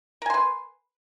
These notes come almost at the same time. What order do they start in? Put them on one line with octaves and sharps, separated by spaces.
A#4 G#5 C6 B4